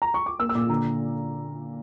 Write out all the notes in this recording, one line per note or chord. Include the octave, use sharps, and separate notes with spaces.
A#5
C#6
D6
A#3 E6
E6
A#2 D6
D3 A#5